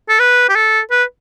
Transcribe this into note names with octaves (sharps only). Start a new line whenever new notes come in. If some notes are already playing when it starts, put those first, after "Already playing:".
A4
B4
G4
A4
B4